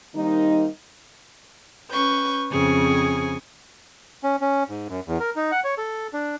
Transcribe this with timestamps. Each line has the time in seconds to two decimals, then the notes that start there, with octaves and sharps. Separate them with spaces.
0.15 D#3 G3 A#3 C4 D#4
1.90 C#4 B4 C#6 G6
2.51 F2 C#3 C4 G#4 G#5 C#6
4.23 C#4
4.41 C#4
4.69 G#2
4.89 F#2
5.08 E2
5.20 A#4
5.36 D#4
5.52 F#5
5.64 C#5
5.78 A4
6.13 D4